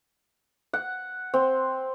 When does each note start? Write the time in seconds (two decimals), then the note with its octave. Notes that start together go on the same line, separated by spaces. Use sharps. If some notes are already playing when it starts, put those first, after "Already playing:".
0.73 F#5
1.34 C4